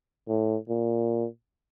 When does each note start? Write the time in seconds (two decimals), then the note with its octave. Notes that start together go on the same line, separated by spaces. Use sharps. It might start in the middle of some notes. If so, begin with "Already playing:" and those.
0.28 A2
0.69 A#2